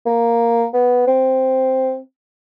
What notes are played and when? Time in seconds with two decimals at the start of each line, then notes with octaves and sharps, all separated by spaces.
0.06 A#3
0.73 B3
1.07 C4